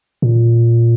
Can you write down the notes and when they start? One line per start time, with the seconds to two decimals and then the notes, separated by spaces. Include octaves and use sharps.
0.22 A#2